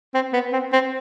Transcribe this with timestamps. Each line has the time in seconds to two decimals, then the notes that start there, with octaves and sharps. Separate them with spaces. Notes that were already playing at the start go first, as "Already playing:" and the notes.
0.14 C4
0.33 B3
0.53 C4
0.73 C4